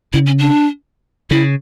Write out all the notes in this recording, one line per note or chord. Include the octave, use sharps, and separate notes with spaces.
C#3 E4
C#4
D4
C#3 E4